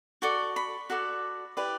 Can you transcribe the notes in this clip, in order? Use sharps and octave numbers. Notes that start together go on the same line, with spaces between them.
F#4 A4 D5 C#6
B5
F#4 A4 D5
E4 G4 B4 D5